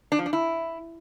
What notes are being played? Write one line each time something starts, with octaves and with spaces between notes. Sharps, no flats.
D4
F3
D4
E4